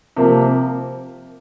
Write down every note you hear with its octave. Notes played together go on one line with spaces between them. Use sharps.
C3 F3 A#3